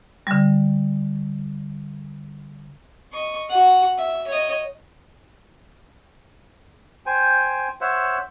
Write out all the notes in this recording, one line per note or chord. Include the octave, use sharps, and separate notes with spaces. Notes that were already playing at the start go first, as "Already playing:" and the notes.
D3 G3
D#5 C#6
F#4 F#5
E5
C#5 D#5
C5 G5 G#5
C5 C#5 E5 F#5